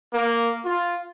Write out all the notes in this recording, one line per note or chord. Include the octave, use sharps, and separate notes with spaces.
A#3
F4